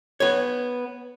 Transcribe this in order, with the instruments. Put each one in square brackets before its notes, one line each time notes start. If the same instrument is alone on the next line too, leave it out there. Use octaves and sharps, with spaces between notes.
[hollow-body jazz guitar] B3 C#5